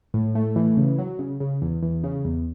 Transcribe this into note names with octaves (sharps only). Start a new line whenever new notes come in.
A2
A3
E3
C#3
F#3
C#3
C#3
E2
E2
C#3
E2